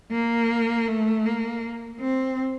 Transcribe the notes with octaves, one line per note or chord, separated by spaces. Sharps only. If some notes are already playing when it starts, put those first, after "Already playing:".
A#3
A3
A#3
C4